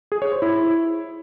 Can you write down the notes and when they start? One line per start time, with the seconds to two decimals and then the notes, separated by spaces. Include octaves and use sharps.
0.12 G#4
0.22 C#5
0.32 C5
0.42 E4